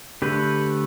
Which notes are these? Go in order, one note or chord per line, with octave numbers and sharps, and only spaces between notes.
D3 A3 G4 B4